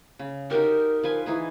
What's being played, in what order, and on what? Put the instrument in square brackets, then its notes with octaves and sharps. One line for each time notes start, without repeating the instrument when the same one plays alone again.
[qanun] C#3
[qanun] D#4 F#4 G4 [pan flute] A#4
[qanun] F3 B4 G#5
E3 D#4 G#4